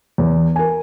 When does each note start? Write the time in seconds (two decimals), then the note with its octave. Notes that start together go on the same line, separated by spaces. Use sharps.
0.18 E2
0.56 A#4 G#5